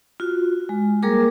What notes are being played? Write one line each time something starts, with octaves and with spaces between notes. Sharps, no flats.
F4 F#4
G#3
G3 A#3 G#4 A#4 D6